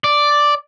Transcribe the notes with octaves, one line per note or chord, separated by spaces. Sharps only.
D5